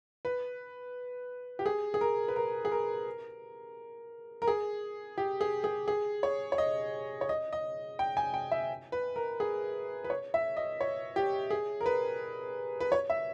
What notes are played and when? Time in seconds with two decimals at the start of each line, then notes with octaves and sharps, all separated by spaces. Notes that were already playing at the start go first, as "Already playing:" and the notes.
0.25 B4
1.59 G4
1.66 G#4
1.94 G#4
2.01 A#4
2.28 B4
2.36 A#4
2.65 G#4
2.72 A#4
4.42 A#4
4.47 G#4
5.18 G4
5.41 G#4
5.64 G#4
5.88 G#4
6.23 C#5
6.52 C#5
6.58 D#5
7.21 C#5
7.29 D#5
7.53 D#5
7.99 G5
8.17 G#5
8.34 G5
8.51 E5
8.92 B4
9.16 A#4
9.40 G#4
10.04 B4
10.10 C#5
10.34 E5
10.57 D#5
10.81 C#5
11.16 G4
11.50 G#4
11.81 A#4
11.86 B4
12.80 B4
12.92 C#5
13.10 E5